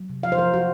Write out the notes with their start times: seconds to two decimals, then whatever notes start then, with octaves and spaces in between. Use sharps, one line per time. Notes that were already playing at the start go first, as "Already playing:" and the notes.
Already playing: F#3
0.10 C3
0.23 F3 F5
0.32 C5
0.38 F3 A#4
0.54 F3 F#4